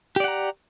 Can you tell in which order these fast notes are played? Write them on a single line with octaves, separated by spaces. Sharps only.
G4 D5 F#5 A#5